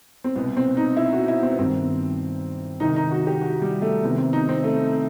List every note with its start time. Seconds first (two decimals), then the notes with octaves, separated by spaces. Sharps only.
0.24 C4
0.36 C2 B2 B3
0.57 C4
0.77 D#4
0.97 E4
1.13 F#4
1.28 E4
1.43 C4
1.51 B3
1.59 G2 D#3 C4
2.80 C2 C3 D#3 D#4
2.96 D#4
3.11 F#4
3.27 G4
3.41 F#4
3.62 G3
3.82 A3
4.03 C2 C3 D#3 B3
4.18 C4
4.33 D#4
4.49 C4
4.64 A3